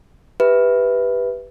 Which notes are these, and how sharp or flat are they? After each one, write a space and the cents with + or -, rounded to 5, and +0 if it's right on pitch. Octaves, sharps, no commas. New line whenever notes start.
G4 +0 B4 +0 E5 -5